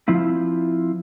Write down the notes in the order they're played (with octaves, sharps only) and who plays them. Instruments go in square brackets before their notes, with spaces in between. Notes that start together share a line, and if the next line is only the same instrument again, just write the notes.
[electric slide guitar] F3 C4 E4 F4